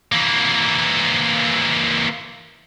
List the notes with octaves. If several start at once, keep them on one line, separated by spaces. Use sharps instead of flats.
E3 A#3